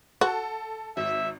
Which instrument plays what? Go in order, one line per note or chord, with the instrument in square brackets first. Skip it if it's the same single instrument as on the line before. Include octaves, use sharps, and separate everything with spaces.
[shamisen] F#4 [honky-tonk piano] A4
[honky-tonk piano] G#1 [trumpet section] E5